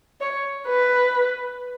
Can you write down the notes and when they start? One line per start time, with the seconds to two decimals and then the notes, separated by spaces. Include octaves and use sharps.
0.21 C#5
0.68 B4